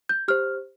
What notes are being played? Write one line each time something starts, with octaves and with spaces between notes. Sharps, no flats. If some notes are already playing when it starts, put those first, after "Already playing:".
G6
G4 C5 F6